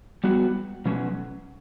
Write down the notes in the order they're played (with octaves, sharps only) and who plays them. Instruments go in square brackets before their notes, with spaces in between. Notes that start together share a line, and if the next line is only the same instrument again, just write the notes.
[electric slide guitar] G3 B3 F#4
B2 F#3 C#4